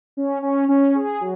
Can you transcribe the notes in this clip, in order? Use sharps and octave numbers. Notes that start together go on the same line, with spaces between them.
C#4
C#4
C#4
G#4
F#3